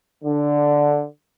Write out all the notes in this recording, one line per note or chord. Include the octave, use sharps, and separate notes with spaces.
D3